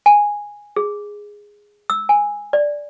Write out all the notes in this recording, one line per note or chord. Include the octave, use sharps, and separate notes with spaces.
G#5
G#4
E6
G#5
D5